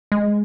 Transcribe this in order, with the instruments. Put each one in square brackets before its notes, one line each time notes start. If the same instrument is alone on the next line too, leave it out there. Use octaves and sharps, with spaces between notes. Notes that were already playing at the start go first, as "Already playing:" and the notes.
[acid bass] G#3